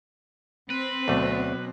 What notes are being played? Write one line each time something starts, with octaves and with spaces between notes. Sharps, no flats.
C4 B4
D2 B2 F#3 A3 D6